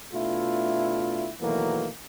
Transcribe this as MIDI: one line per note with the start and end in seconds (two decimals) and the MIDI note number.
0.13 1.30 47
0.13 1.30 57
0.13 1.30 62
0.13 1.30 64
0.13 1.30 65
1.41 1.89 47
1.41 1.89 51
1.41 1.89 52
1.41 1.89 54
1.41 1.89 57
1.41 1.89 58